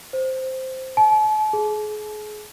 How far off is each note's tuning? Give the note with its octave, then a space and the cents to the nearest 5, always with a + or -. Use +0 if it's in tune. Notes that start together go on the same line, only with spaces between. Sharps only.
C5 -5
A5 -40
G#4 +30